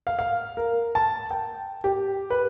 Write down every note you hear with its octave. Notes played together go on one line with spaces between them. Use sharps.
F5
F5
A#4
A5
G5
G4
B4